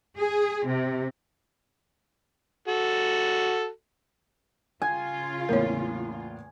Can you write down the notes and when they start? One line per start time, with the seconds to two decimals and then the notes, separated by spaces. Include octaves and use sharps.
0.17 G#4
0.66 C3
2.68 F#4 A4
4.82 C#3 F4 G#5
5.49 E2 A2 A#3 A#4 C#5